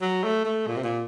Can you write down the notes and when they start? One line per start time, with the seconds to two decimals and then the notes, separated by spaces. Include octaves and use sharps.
0.01 F#3
0.24 A3
0.45 A3
0.67 A#2
0.76 C3
0.84 A#2